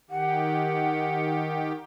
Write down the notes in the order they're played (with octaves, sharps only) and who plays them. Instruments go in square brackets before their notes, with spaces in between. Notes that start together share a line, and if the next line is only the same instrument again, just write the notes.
[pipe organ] D#3 G4 [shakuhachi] F#5